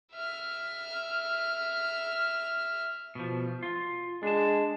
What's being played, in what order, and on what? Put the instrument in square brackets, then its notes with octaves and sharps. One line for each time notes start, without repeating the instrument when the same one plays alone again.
[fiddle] E5 F6
[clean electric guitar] B2 F3
F4
[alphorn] G#3 [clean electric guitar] D4 A5